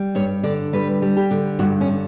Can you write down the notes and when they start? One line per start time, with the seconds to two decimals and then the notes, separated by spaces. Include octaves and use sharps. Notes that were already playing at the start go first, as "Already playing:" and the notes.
Already playing: G3
0.15 G2 C#5
0.43 D3 D5
0.73 G3 B4
1.02 G3
1.17 G4
1.31 D3
1.59 G2 F#4
1.81 C#4
1.88 D3